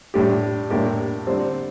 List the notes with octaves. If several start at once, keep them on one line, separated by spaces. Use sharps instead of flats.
A2 G3 D4 G4
A2 G3 A#3 D4 G4
D3 G3 C4